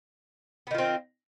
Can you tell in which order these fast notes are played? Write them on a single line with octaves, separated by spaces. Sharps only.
B3 D#3 F4 C4